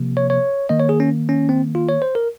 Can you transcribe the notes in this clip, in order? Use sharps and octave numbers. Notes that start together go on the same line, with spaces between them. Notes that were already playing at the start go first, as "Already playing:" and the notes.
Already playing: C3 F3 A#3
C#5
C#5
D#3 A#3 D#5
C#5
G#4
C#4
C#4
C4
F4
C#5
C5
A#4